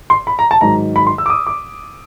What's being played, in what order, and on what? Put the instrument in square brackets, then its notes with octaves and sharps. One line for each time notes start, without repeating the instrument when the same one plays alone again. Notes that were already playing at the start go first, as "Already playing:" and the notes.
[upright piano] C6
B5
A#5
A5
G#2 D#3 F#3 A#5
B5
C6
E6
D6
D#6
D6